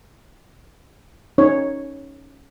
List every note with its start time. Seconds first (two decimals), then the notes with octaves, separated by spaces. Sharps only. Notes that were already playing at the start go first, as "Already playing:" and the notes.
1.38 C#4 D#4 C#5